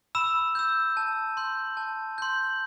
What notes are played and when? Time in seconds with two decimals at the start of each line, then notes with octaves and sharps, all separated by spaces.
0.15 B5 E6 E7
0.55 E6 G6
0.97 A5
1.37 C6 G6
1.77 A5
2.18 C6 G6